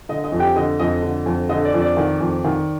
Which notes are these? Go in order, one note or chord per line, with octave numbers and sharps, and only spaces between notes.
D3 D#5
D#5
F2
G4 G5
D3 D#5
F2 D#5
D3
F2
D3 D#5
D5
F2
D5
D#3
F2
D#3